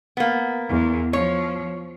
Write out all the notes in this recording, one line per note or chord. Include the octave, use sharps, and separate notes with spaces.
A#3 B3
E2
F3 C#5